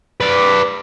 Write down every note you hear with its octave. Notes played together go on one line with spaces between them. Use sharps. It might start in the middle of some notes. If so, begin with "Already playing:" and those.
B4 D5